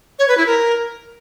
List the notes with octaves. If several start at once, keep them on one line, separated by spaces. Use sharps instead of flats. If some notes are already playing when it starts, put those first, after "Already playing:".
C#5
B4
E4
A#4